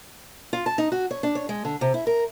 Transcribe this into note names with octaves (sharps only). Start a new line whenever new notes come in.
F4
A5
D#4
F#4
C#5
D4
C#5
G#3
D3
C3
E4
A#4